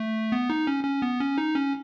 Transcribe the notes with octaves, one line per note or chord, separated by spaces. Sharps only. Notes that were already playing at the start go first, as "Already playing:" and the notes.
Already playing: A3
B3
D#4
C#4
C#4
B3
C#4
D#4
C#4